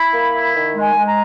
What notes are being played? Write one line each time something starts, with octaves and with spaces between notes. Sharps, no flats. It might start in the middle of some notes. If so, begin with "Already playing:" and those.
Already playing: E4 B5
A#3
E4
D#3
G#3
G#5
G#3
A#5